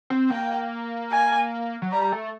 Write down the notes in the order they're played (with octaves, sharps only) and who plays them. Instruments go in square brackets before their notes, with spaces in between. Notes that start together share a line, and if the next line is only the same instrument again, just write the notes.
[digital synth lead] C4
[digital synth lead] A#3 [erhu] G5
[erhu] G#5
[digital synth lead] F#3
[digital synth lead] G3 [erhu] A#5
[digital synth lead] A3